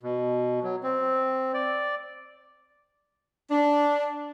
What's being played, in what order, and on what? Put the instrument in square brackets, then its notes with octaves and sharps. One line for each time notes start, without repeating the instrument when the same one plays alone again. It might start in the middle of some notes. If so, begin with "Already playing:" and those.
[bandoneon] B2
F#3
C4
D5
[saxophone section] D4